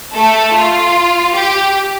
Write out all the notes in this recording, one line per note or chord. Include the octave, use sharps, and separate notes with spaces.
A3 A4
F4
G4